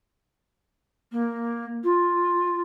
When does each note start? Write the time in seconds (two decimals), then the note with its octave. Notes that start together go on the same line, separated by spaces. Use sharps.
1.12 A#3
1.84 F4